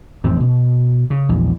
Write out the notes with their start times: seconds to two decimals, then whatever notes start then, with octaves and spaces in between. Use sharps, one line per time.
0.24 A1 F2 G#2 C4
0.40 B2
1.10 C#3
1.29 A#1 E2